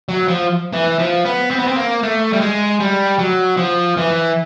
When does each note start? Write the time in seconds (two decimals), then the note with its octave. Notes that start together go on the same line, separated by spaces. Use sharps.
0.09 F#3
0.28 F3
0.73 E3
0.99 F3
1.25 B3
1.51 C4
1.59 B3
1.67 C4
1.76 A#3
2.03 A3
2.33 G3
2.41 G#3
2.80 G3
3.19 F#3
3.57 F3
3.97 E3